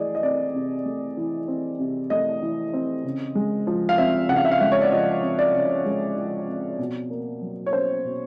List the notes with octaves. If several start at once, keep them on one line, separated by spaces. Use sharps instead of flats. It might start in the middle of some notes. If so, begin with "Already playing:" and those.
Already playing: E3 A3 G#4 D5 D#5
D#5
C4 D5
C3
A3
E3
C4
C3
A3 D#5
E3
C4
C#3
G#3
F3
F5
C4 E5
C#3 F#5
F5
E5
F5
G#3 E5
C#5
D5
F3 D#5
C4
D5
C#3
G#3
F3
C4
B2
A#3
F#3
C#5
C#4 C5
B2